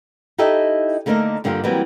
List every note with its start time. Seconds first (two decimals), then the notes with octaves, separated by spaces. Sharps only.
0.38 D#4 E4 G4 A4 D#5 E5
1.06 D3 A3 A#3 D4 D#4 A#4
1.44 G2 D3 G3 A#3 F4
1.64 E3 F#3 G3 A#3 C4